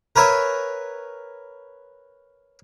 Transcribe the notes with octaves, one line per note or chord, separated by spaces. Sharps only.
A#4 B4 C#5 E5 G#5